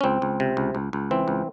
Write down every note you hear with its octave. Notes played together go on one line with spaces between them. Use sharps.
C#4
C#2 C4
C#2
C3
C#2
C#2
C#2
E3 C4
C#2